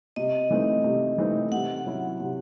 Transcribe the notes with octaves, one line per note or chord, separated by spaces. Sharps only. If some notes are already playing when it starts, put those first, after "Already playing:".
C3 D#5
E3 A3 C4 D#4
C3
E3 A3 C4 D#4
C3 F#5
F#3 C#4 E4
C3